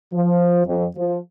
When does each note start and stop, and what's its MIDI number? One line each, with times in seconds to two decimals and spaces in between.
0.12 0.62 53
0.65 0.84 41
0.96 1.18 53